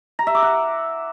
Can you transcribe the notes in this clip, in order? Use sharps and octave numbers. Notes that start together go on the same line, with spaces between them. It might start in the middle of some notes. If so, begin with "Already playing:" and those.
A#5
E5
D6
F#5